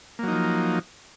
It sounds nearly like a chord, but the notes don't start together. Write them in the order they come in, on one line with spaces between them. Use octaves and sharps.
A#3 F#3 D#4 F3